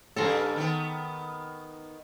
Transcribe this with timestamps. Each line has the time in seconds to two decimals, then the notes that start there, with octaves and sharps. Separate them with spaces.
0.16 G2 C#3 A4 A#5 C6
0.56 D#3 B3